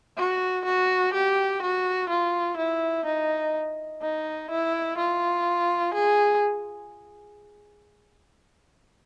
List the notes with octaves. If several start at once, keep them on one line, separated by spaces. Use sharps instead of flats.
F#4
F#4
G4
F#4
F4
E4
D#4
D#4
E4
F4
G#4